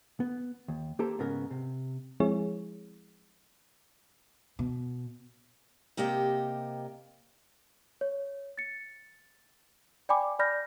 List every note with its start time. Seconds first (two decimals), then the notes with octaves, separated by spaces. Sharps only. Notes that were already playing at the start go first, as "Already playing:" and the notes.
0.20 B3
0.68 D#2
0.99 A#3 G4 A4 C5 A#5
1.19 G#2 C#3 B3 A#4
1.51 C3
2.20 F3 G#3 C4 E4 G#4 C#5
4.59 B2
5.97 C3 A#3 G4 D#5 G5
8.01 C#5
8.58 A6 C#7
10.09 D5 G5 G#5 B5 D6
10.39 D5 B5 F6 G6 A#6